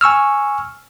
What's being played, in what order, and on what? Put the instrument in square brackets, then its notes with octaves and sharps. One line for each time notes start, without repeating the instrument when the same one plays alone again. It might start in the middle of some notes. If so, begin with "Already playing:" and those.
[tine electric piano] G#5 C#6 E6 F6